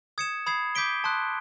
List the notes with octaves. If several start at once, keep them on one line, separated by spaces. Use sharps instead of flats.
D#6 G#6 C#7 E7
B5 D#6 G#6 C7
D6 G6 B6 D7 G7
A5 C6 D#6 F#6